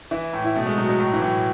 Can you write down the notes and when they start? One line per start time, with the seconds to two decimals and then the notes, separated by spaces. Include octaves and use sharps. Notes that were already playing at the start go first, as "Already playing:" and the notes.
0.11 E3 E4
0.33 A2
0.44 E4
0.56 B2 A3
0.66 G#3
0.77 B2 F#3
0.89 F#3
1.00 A2 F#3
1.13 E3
1.22 A2 F#3